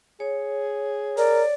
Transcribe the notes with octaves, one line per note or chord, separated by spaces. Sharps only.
G#4 C#5
A#4 D5